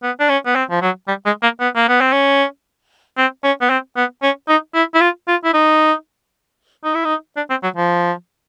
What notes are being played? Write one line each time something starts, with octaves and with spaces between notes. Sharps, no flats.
B3
D4
C#4
B3
C4
F3
F#3
G3
G#3
A#3
B3
A#3
B3
C4
C#4
C4
C#4
B3
C4
B3
C#4
D#4
E4
E4
F4
F4
E4
D#4
D#4
E4
D#4
D4
C4
F#3
F3